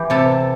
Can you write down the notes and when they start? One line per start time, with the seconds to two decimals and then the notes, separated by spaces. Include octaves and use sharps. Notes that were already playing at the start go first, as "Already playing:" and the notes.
Already playing: E3 G4
0.10 C3 A4